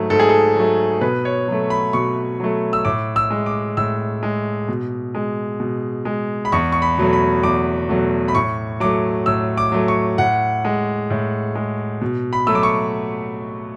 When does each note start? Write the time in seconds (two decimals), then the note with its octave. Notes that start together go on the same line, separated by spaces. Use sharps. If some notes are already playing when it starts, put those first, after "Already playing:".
Already playing: G#2 F#3 A3
0.10 G#2 A4
0.20 G#4
0.29 A4
0.56 F#3 A3
1.01 B2 B4
1.25 C#5
1.48 F#3 A3
1.70 B5
1.93 B2 C#6
2.40 F#3 A3
2.73 E6
2.85 A2 D6
3.16 E6
3.30 G#3
3.46 D6
3.77 A2 E6
4.23 G#3
4.68 B2
5.15 G#3
5.60 B2
6.05 G#3
6.45 B5
6.52 E2 C#6
6.72 C#6
6.82 B5
6.98 B2 F#3 A3
7.13 B5
7.43 E2 D6
7.89 B2 F#3 A3
8.28 B5
8.35 A2 C#6
8.80 F#3 A3 D6
9.26 A2 E6
9.57 D6
9.72 F#3 A3
9.88 C#6
10.18 A2 F#5
10.65 G#3
11.10 A2
11.55 G#3
12.01 B2
12.33 B5
12.47 F#3 A3 E6
12.55 D6
12.63 C#6